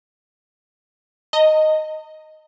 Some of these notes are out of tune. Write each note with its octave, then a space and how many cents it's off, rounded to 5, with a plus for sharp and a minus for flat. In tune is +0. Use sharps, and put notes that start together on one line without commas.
D#5 +0 A#5 -45